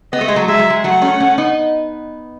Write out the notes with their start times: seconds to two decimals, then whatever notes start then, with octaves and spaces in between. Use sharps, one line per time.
0.13 B3 D#5
0.21 A3
0.28 G#3
0.36 F#3 A3
0.48 G#3 E5
0.59 F#3
0.70 G#3
0.84 F#3 A3 F#5
1.01 A3 C#4
1.20 A3 C#4
1.38 B3 D#4